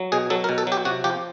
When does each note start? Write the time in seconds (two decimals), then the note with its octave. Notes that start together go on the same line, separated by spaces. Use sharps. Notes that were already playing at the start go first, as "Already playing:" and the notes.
Already playing: F#3
0.12 B2 G#4
0.30 F#3 A4
0.44 A#4
0.49 B2
0.58 A4
0.67 F#3 G4
0.85 C3 F#4
1.04 F3 G4